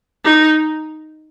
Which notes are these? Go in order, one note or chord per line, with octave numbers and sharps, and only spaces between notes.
D#4